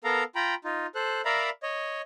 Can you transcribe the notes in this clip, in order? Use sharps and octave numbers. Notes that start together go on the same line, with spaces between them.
B3 A4 A#4 F5 A#5
F4 G5 A#5 B5
D#4 F4
A4 C5 F#6
A#4 D5 E5 F5 A#5 B5
C#5 D#5